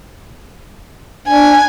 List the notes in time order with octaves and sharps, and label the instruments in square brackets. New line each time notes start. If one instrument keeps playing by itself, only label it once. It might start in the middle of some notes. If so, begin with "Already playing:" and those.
[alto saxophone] D4 [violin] G#5